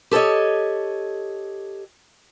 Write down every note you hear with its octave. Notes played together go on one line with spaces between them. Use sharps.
G4 A4 C5 C#5 D#5